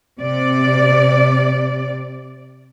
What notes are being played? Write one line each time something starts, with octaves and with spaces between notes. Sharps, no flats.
C3 D5